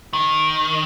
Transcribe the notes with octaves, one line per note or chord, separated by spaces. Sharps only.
D#3